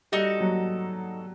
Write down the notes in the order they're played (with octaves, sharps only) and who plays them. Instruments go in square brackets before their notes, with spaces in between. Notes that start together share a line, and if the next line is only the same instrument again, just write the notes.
[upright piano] G3 [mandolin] D#4 F#4 A4
[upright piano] F#3